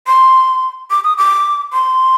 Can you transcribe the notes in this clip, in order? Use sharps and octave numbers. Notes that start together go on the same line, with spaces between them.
C6
D6
D#6
D6
C6